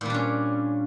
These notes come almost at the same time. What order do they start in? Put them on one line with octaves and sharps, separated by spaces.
A#2 G3 D4 C#4